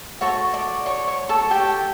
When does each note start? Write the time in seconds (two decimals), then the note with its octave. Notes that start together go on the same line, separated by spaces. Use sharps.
0.21 F#4 A4 C#5 C#6
0.54 D5 D6
0.86 C#5 C#6
1.08 C#5 C#6
1.29 A4 A5
1.51 G4 G5